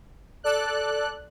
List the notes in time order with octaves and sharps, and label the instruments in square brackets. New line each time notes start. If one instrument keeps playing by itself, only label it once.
[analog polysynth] A4 D5 F#6